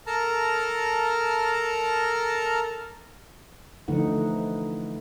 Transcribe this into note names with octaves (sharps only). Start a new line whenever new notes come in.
A4 A#4 A5 A#5 F6
D3 E3 F3 A3 D#4 F#5